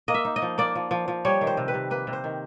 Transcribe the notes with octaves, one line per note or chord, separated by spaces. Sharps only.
A#3 D#5
E5
D#4
D#5
F3
A#3 D5
F3
F3
F3
G3 C#5
D#3
C5
C3
B4
C3
A#3 B4
C3
C5
D#3